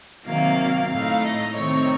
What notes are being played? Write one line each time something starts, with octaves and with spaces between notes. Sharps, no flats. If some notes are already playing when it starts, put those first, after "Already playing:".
C3 D#3 F#3 A#3 F5
A2 A3 D#4 F5
D#5
C3 D#3 A3 C4 D#4 C#5